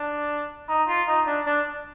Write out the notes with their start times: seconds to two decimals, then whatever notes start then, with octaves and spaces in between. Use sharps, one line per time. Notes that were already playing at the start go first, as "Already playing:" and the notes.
Already playing: D4
0.69 D#4
0.88 F4
1.08 D#4
1.27 D4
1.46 D4